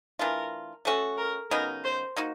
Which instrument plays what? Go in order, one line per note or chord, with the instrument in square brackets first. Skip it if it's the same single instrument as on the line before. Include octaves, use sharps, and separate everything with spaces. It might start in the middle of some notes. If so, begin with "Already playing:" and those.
[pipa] E3 A3 D4 F4 [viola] A#4
[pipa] A3 C#4 F#4 [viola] A4
[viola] A#4
[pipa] C#3 F#3 B3 D#4 [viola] A#4
[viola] C5
[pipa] A#3 D#4 F#4